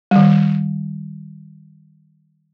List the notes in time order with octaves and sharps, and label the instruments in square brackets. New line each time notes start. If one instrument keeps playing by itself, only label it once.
[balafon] D#3 G3